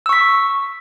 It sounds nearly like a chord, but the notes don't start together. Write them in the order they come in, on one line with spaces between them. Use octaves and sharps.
E6 C#6 B6